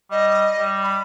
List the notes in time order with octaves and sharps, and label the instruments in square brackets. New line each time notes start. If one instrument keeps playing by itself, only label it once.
[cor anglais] G3 [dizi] D#5
[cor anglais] G3
[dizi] B5